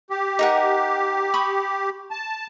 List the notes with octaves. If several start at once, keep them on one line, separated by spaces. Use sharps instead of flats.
G4
D#4 A#4 F#5
B5 C#6 D#6
A5